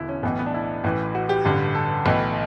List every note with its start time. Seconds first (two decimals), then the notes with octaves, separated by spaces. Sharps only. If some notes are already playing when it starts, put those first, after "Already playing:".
Already playing: E1 D3 E4
0.09 C#4
0.23 B1 A2 E3 B3
0.39 B3
0.46 D4
0.54 E4
0.84 A1 A2 E3
1.15 F#4
1.29 G4
1.45 A1 G2 D3
1.75 A4
2.05 B1 A2 E3